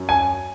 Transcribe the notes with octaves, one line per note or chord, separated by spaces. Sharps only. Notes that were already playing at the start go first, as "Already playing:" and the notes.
Already playing: F#2 F#3
G#5